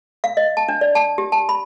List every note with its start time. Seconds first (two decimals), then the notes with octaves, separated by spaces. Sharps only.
0.24 F5
0.37 D#5
0.57 A5
0.69 D4
0.81 D5
0.95 A5
1.18 G4
1.32 A5
1.49 B5